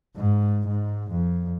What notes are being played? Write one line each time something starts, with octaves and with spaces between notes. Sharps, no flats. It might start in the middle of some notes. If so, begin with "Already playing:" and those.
G#2
G#2
F2